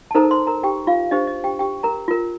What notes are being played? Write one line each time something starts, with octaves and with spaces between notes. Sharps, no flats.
A5
D#4 A4 A#4 C5 A#5
C5 C6
A#4 A#5
G4 G5
F4 F5
D4 G4 C5 D#5
D#5
G4 G5
G4 G5
A#4 A#5
F4 A#4